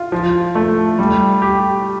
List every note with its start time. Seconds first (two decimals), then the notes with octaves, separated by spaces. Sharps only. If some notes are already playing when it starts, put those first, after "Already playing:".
Already playing: F4
0.12 F3
0.55 A3
0.99 G3
1.42 G4